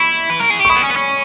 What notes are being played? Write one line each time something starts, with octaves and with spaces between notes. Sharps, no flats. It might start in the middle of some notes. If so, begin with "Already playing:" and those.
Already playing: E4 B5 C#6
B4
A#4
G#4
G4
C#6
E4 B5 D#6
B3
C#4
B3
C#4